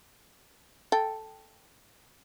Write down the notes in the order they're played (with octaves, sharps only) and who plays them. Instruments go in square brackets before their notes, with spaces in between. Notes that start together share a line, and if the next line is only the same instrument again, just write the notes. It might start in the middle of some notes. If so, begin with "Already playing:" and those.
[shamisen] A4 G5